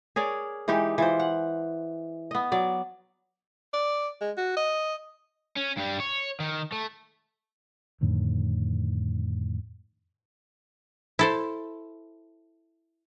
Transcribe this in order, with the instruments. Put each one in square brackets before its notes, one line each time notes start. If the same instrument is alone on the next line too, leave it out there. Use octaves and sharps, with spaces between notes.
[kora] G#4 A#4 C#5 D5
E3 G#3 D#4 G4
E3 F4 C5
F#5
B3 D#5
F#3 D5
[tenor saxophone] D5
G#3
F#4
D#5
[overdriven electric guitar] C#4
G2 G3
C#5
D#3
A3
[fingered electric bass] F2 A2 D3 D#3
[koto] E4 A4 C5